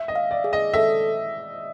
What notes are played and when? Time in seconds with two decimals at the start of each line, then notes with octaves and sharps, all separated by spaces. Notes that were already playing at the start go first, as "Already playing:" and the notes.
Already playing: E5
0.08 D#5
0.16 F5
0.31 D5
0.44 G#4
0.53 D#5
0.74 A4 E5